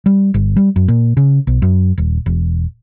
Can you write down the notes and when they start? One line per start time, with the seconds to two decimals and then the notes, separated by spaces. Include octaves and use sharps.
0.06 G3
0.34 G1
0.56 G3
0.76 F#2
0.88 A#2
1.17 C#3
1.47 B1
1.62 F#2
1.98 D#1
2.26 E1